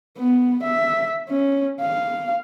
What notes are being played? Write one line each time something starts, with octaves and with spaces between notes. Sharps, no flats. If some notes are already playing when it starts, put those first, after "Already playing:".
B3
E5
C#4
F5